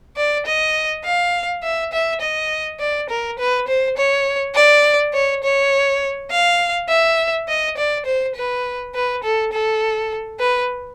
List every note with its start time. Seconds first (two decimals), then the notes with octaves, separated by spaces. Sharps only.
0.17 D5
0.46 D#5
1.04 F5
1.63 E5
1.93 E5
2.21 D#5
2.80 D5
3.10 A#4
3.39 B4
3.68 C5
3.97 C#5
4.55 D5
5.13 C#5
5.43 C#5
6.31 F5
6.89 E5
7.48 D#5
7.77 D5
8.06 C5
8.36 B4
8.95 B4
9.24 A4
9.52 A4
10.40 B4